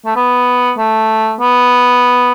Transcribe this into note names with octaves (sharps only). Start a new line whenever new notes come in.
A3
B3
A3
B3